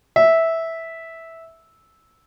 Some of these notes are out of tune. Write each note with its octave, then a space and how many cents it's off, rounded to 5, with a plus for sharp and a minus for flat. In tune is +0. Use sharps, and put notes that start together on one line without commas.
E5 -10